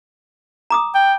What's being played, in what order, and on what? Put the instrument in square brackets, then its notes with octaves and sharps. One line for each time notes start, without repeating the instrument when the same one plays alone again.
[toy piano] A#5 D6 D#6
[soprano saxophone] G5